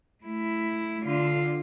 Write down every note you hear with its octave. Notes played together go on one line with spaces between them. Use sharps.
A3 E4
D3 F4